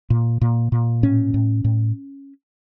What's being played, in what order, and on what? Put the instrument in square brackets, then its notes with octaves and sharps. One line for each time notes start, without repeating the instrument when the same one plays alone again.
[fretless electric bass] A#2
A#2
A#2
A2 C#4
A2
A2